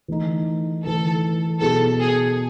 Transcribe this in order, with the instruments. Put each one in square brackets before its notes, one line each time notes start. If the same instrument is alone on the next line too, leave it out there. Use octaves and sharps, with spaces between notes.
[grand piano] E3 A3 D#4
[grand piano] E3 A3 D#4 [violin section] A4
[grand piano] B2 F#3 B3 E4 G#4 [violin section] A4
[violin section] G#4